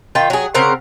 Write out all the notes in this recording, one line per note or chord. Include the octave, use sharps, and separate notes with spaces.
D#3 F4 G5
F#3 G#4
C#3 C4 A#4 F#5